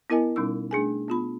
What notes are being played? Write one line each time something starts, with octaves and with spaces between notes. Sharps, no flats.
B3 E4 A#4 D#5 G#5
B2 G3 C#4 D#4 E6
A3 D4 G#4 G#5
B3 F4 B5